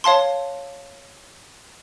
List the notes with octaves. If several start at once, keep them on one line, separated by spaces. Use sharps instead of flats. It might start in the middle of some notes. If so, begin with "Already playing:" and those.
C#5 F5 A5 C6